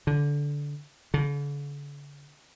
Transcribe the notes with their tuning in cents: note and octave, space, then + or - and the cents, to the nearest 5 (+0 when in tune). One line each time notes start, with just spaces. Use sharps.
D3 -15
D3 -45